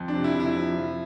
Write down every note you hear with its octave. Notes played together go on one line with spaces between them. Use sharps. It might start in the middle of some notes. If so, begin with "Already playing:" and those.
Already playing: F2
D4
C3
E4
F2
E4
F3
F3